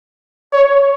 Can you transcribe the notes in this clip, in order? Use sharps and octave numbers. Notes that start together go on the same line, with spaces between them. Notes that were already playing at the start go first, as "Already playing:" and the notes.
C#5